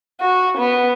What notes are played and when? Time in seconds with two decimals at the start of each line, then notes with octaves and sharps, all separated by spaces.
0.20 F#4
0.57 B3